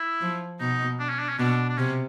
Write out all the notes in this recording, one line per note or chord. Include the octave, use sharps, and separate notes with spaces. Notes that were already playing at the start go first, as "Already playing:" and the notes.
Already playing: E4
F3
B2 D#4
D4
C#4
D4
C#4
B2 D4
D4
C3 C#4